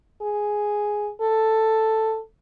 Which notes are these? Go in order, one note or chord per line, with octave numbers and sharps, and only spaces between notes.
G#4
A4